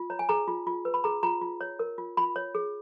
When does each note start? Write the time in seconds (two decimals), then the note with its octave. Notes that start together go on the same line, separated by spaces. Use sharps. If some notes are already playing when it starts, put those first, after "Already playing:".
Already playing: F4
0.10 C#5 A#5
0.19 G#5
0.29 G#4 A#5
0.48 F4
0.67 F4
0.85 B4
0.94 B5
1.04 G#4 A#5
1.23 F4 A#5
1.41 F4
1.61 C#5
1.79 A#4
1.98 F4
2.17 F4 B5
2.36 C#5
2.55 G#4